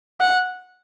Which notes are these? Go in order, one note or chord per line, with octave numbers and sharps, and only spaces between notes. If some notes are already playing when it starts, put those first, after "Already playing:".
F#5